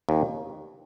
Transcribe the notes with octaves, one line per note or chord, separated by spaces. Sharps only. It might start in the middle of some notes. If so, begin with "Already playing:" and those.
D#2